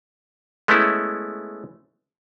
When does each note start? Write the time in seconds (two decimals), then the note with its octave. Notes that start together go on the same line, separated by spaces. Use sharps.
0.68 G#3 A3 B3 C#4 E4